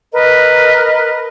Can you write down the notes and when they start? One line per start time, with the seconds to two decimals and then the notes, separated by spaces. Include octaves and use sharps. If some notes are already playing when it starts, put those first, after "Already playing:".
0.13 A#4 B4 D#5